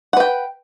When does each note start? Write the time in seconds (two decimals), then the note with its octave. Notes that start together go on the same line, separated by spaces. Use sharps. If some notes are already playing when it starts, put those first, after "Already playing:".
0.13 F#5
0.17 B4
0.20 G5